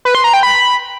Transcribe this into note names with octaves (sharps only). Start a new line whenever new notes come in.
B4
C6
A#5
G5
B5